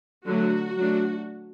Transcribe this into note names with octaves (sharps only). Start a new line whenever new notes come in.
D3 F#3 A3 F#4
F#3 A3 D4